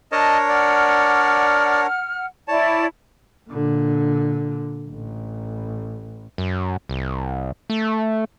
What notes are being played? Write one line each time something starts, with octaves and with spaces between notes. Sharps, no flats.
D4 A#4 C#5 D#5 A5
D5 F#5 F6
E4 C#5 D5 A5
A#2 D3
A1
F#2
C2
A3